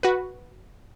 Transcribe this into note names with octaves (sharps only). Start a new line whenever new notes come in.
F#4 B4